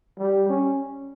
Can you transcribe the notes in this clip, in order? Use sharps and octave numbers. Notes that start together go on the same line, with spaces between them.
G3
C#4